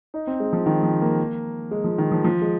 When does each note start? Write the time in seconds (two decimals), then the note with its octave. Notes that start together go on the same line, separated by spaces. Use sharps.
0.14 D#4
0.27 C4
0.40 G#3
0.53 F3
0.66 D#3
0.83 F3
1.02 A#3
1.71 G#3
1.84 F3
1.98 D#3
2.12 F3
2.24 F3
2.42 G#3